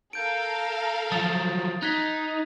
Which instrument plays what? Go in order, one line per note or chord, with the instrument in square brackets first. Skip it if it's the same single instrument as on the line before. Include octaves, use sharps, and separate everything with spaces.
[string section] A4 A#4 F5 [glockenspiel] G6 D7
[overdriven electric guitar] F3 F#3 [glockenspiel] D#6 A6
[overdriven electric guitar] D#4 [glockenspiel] F#6 G#6 B6